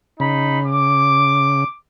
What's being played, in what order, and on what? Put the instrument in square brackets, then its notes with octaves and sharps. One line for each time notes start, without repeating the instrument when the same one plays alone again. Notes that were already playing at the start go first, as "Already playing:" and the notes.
[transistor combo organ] C#3 [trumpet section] D#4 B5
[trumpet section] D6